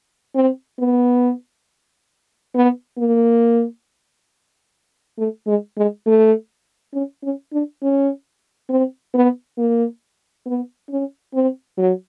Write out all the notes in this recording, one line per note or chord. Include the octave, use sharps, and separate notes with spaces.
C4
B3
B3
A#3
A3
G#3
G#3
A3
C#4
C#4
D4
C#4
C4
B3
A#3
B3
C#4
C4
F#3